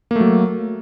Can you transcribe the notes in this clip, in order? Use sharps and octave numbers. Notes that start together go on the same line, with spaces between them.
F#3 A3 A#3